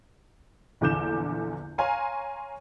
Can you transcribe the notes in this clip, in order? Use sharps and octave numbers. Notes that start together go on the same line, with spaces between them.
A#1 E2 D3 D6 G6 E7
C#5 F5 G#5 A#5 C6